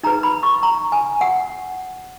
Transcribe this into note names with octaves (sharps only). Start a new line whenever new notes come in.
D#4 G#4 B4 A#5
B5
C#6
A#5
G#5
F#5